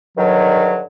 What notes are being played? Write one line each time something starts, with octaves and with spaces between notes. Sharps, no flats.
G2 D3 D#3 F#3